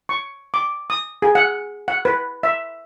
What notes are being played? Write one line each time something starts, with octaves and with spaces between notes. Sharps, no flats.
C#6
D6
D#6
G#4
F#5
F#5
B4
E5